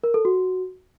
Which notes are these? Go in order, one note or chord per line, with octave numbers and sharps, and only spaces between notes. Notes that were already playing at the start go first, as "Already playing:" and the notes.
A#4
A4
F#4